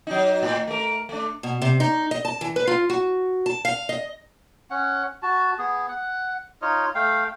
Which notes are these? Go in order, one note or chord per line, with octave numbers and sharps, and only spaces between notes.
F#3 D#4
A2
A3 A#4
A3 D4
B2
C3
D#4
D#5
A5
E3
B4
F4
F#4
A5
F5
D#5
C#4 F#5
F#4 A5
B3 G#4
F#5
D#4 F4 C#5 D#5
A3 F5 G5